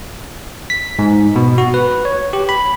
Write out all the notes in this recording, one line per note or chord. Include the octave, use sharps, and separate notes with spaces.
B6
G#2
B2
F#4
B4
C#5
G4
B5